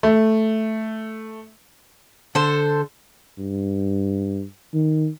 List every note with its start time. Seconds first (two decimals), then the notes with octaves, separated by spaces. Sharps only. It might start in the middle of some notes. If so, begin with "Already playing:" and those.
0.03 A3
2.35 D3 A4 C5
3.39 G2
4.74 D#3